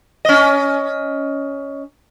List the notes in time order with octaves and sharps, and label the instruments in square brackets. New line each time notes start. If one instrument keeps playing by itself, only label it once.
[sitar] C#4 D#5